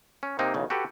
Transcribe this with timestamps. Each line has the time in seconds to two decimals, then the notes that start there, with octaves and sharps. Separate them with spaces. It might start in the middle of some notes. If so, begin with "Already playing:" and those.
0.23 C#4
0.39 C3 A#3 C4 D#4
0.54 B1 E2 C#3
0.70 F#4 G4 A4 B4